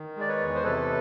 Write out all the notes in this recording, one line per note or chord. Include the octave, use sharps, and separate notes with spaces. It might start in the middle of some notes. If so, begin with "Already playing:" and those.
Already playing: D#3
G#3 D5
B4 C#5
E2
C5
C3 A4 B4